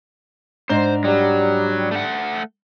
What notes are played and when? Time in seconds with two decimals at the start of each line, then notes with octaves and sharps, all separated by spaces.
0.69 G#2 D4 C5 A#5
1.04 F#3 G3
1.91 A3 F#5